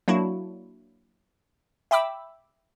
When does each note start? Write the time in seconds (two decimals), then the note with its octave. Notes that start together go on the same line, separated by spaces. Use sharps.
0.08 F#3 A#3 D4 E4 F#4
1.91 E5 G5 B5 D6 E6